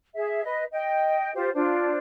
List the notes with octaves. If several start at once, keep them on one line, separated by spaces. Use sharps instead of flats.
G#4 E5
B4 D#5
D#5 G5
F4 G4 C5
D4 F4 C5